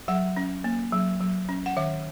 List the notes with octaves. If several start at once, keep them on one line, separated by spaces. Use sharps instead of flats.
F#3 F#5
C#4
A#3
F#3
F#3
C#4
F#5
D#3 E5